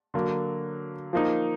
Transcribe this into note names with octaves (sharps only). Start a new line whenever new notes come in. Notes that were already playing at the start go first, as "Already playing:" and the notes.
D3 F#3 A#3
F3 A#3 D#4